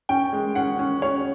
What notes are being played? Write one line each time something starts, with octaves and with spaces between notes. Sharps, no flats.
C#4 G5
G#3
C#4 F#5
C#4
C#4 C#5